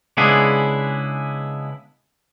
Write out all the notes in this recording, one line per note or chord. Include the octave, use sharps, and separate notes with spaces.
C#3 G#3 B3 D4 E4 G#4